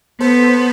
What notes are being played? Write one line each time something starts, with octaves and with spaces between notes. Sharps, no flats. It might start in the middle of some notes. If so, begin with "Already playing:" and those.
B3 A4 C5